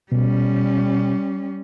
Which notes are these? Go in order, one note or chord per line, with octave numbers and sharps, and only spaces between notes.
B2 G3 C#4